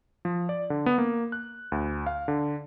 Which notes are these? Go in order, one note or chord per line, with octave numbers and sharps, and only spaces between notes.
F3
D5
D3
B3
A#3
F#6
D2
F5
D3